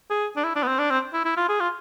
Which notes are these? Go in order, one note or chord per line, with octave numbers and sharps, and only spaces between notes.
G#4
D4
E4
D4
B3
C4
D4
C4
E4
E4
F4
G#4
F4